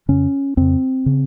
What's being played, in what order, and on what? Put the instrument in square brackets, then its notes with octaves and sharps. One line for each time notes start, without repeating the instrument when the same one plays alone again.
[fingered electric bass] F2 C#3 C#4
F2 C#3 C4
C#3